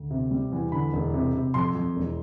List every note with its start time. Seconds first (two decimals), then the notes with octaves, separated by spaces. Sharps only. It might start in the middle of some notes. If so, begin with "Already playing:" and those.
Already playing: D2
0.11 C3
0.31 G3
0.52 E2
0.72 D3 B5
0.93 E1
1.14 C3
1.34 C3
1.54 F2 C6
1.75 F2
1.96 E1